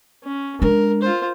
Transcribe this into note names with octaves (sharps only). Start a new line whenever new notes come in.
C#4
G#3 D4 A#4
F4 C5